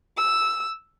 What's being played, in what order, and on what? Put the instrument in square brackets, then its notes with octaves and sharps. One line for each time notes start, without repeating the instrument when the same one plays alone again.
[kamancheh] E6